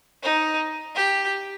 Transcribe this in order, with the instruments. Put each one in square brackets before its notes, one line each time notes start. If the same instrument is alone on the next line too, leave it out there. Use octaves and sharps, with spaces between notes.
[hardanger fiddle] D#4
G4